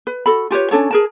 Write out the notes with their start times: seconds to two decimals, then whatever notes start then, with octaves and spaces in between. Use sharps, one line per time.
0.07 B4
0.26 F#4 A4 B5
0.51 F4 G4 B4 C#5
0.71 C#4 D4 A4 C#5
0.91 G#4 A#4 A5